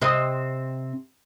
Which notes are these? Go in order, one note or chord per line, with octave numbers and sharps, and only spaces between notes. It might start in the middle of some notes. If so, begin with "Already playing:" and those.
C3 C4 D#5